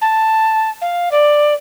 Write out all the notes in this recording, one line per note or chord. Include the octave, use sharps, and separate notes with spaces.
A5
F5
D5